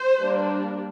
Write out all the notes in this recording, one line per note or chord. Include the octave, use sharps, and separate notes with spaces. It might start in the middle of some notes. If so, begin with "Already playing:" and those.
Already playing: C5
G3 A#3 D4